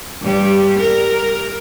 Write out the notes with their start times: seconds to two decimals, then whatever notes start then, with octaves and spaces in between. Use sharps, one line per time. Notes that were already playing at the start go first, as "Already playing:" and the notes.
0.21 G2 G3
0.79 A#4